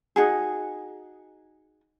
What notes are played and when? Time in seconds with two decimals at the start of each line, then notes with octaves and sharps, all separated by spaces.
0.16 D#4 F#4 G#4